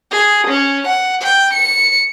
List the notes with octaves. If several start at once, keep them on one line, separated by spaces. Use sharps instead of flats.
G#4
C#4
F#5
G5
C#7